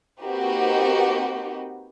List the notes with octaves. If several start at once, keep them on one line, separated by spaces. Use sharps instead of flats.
A#3 C4 D#4 F#4 G4 B4